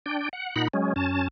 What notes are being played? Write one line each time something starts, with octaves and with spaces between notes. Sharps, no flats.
D4 G5
F#5
A#2 D#4 F#5 B5
F#3 G#3 C#4
F#2 C#4 A5